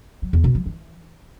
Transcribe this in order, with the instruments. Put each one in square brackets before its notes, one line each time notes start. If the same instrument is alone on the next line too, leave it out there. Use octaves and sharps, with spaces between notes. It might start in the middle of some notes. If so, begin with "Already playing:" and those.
[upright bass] F#3
E2
B2
F3
E3